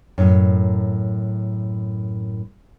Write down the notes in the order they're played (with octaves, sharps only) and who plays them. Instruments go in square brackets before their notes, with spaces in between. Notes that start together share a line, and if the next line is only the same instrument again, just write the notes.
[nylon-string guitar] F#2 A2